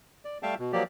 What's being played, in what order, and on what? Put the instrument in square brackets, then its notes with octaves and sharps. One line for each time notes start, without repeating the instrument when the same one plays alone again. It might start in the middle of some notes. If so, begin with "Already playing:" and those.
[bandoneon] D5
G3 A3 E5 F5 G5 A5
B2
F3 F#3 A#3 G4 D5